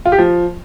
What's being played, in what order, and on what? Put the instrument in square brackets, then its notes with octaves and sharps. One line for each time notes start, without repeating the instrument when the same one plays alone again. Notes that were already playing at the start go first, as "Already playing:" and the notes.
[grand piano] F4
G4
F3